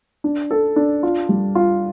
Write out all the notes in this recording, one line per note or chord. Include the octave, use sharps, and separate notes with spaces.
D4
A4
D4
F4
G3
F4